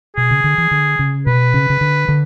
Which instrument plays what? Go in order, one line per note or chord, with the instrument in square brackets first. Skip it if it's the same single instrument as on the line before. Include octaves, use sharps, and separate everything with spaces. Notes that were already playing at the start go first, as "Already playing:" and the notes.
[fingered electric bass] B2 [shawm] G#4
[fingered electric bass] C#3
D3
E3
D3
C#3
[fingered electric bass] B2 [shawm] B4
[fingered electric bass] C#3
C#3
D3
D3